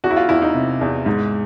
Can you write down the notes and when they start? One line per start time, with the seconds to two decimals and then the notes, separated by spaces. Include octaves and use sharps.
0.04 E2 F#4
0.11 E4
0.17 F4
0.29 E2 E4
0.42 D#4
0.54 C3
0.81 E2
1.06 G#2